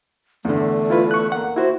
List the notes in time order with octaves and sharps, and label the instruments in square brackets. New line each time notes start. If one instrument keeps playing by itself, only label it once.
[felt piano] E2 D3 [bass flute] A3
[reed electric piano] E4 F4 B4
C#6 F#6
[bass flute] A#3 [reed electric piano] F#5
[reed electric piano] E4 F#4 C5